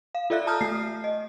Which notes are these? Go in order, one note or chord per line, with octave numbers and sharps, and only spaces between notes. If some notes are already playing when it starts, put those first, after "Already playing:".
F5
F4 A4 D5 E5 F#6
A5 A#5 D#6 F6 G6
A3 C7
D#5